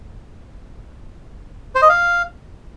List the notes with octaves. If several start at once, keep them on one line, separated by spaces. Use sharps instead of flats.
C5
D#5
F5